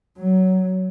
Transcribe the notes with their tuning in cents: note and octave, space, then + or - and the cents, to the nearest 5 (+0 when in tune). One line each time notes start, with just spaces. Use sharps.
F#3 +15